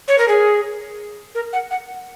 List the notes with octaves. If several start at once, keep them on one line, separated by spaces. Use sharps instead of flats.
C#5
A#4
G#4
A#4
F#5
F#5